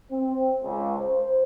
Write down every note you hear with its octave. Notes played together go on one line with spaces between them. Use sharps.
C4
C#2
C5